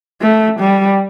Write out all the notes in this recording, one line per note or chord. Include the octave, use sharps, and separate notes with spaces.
A3
G3